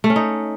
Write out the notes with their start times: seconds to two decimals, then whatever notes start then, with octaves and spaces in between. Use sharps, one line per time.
0.04 A3
0.10 C#4
0.16 D#4